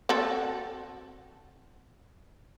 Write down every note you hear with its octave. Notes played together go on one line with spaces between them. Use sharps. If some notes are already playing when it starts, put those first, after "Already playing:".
C4 F#4 A4